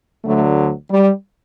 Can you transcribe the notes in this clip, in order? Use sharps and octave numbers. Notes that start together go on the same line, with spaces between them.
D2 D3 F#3 A3
G3